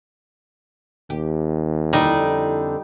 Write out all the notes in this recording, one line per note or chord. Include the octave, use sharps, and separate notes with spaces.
D#2 G4
F2 D3 G3 D#4 E4